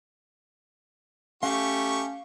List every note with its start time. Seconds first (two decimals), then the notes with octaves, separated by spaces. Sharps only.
1.43 A3 C#4 G4 F5 C#6